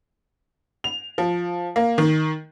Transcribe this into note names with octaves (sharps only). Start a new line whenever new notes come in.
F7
F3
A#3
D#3